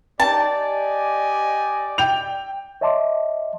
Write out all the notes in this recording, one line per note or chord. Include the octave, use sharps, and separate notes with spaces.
D#4 G4 D5 A5
G4 D#5 G#5
G5 G6 F7
C#5 D#5 E5 A5 C6 D6